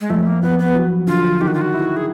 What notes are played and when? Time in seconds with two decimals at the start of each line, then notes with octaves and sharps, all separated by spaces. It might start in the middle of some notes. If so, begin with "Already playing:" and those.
0.01 G#3
0.10 F2 A3
0.26 A#3
0.42 F2 B3
0.59 B3
0.75 F#3
1.07 D3 F4
1.41 D#3 G4
1.47 F#4
1.54 F4
1.61 F#4
1.73 E4
1.96 G#4